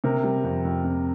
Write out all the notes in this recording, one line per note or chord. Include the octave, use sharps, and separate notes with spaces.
C3 A#4
G3
F2
F2
F2